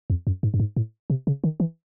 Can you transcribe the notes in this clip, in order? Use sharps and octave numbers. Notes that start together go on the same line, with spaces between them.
F2
F#2
G#2
G2
G#2
A2
C3
C#3
D#3
E3